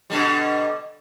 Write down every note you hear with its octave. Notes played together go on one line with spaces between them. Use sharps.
B2 D3 G3